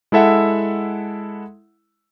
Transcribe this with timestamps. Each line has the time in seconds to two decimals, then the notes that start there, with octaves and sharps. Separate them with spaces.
0.12 G#3 E4 A4 E5 F#5